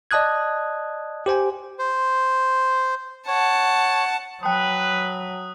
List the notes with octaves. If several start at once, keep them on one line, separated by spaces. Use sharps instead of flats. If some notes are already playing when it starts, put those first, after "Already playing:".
D5 D#5 A5 D#6 F#6 G#6
G4 C5 G5 G#5
C5
C#5 F#5 A5
F#3 B4 G5 A5 D#6 F#6